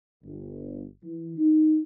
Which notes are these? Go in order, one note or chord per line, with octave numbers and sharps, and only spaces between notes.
G1
E3
D#4